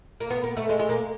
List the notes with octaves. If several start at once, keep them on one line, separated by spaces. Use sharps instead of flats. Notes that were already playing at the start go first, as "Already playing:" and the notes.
A#3
B3
A#3
A3
G#3
G#3
A#3